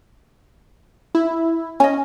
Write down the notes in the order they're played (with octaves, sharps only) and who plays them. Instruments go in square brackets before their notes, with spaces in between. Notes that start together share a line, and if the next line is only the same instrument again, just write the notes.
[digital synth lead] E4
[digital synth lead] C#4 [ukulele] D#5 G#5